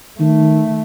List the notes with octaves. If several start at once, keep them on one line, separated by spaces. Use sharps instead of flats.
D#3 A3